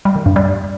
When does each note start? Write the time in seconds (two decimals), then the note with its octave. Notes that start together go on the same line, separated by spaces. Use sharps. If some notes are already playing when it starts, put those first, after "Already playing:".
0.05 G3
0.16 D#3
0.26 G2
0.36 G3